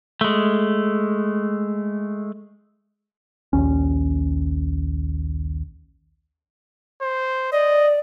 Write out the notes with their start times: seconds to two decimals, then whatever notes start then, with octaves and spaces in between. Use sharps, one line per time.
0.21 G#3 A3
3.53 A#1 D#2 C#4
7.02 C5
7.52 D5 D#5